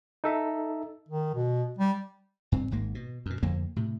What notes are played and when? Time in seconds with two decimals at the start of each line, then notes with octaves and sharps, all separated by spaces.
0.24 D#4 A4 E5
1.09 D#3
1.34 B2
1.79 G3
2.52 G2 C4
2.71 G#1 G#2 A#3
2.95 B2
3.26 F#2 B2
3.43 F2 D3 A#3
3.76 A2 C3